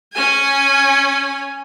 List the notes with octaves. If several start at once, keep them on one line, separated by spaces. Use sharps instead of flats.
C#4 G#5